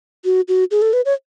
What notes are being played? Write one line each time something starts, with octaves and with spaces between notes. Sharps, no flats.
F#4
F#4
G#4
A4
B4
C#5